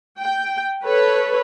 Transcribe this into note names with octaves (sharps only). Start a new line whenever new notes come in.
G5
A4 B4 C#5